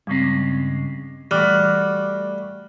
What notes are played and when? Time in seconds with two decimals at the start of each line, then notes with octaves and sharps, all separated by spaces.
0.07 G2 C#3 G3 G#3 C4
1.31 E3 G3 A3 F#4 D6 F6 F#6